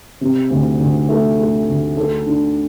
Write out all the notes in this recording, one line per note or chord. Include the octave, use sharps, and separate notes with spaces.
C3
D2
D2
A3
A3
D2
A4
D4